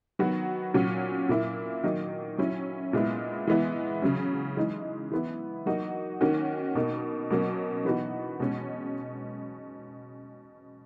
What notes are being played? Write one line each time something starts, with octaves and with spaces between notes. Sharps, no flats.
D#3 F#3 B3 F#4
A#2 F#3 C#4 F#4
A#2 A#3 E4
D#3 F#3 A#3 D#4
F#3 C#4 E4
A#2 G#3 B3 E4
E3 G#3 B3 E4
C#3 F#3 C#4
E3 G#3 D#4
E3 B3 E4
F#3 A#3 D#4 F#4
D#3 A#3 C#4 F#4
B2 A#3 D#4
B2 F#3 A#3 C#4
E3 B3 D#4 F#4
B2 G#3 C#4